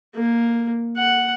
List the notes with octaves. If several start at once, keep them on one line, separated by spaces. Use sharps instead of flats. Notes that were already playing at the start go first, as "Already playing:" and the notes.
A#3
F#5